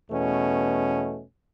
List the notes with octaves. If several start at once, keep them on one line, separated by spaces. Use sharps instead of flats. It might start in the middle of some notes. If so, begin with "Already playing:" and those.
E2 B2 A3 C#4